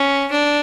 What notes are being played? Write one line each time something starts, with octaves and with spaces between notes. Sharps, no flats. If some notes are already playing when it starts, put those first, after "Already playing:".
Already playing: C#4
D4